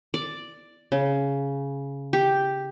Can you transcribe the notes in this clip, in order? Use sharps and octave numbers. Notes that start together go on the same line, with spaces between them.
D5
C#3
G4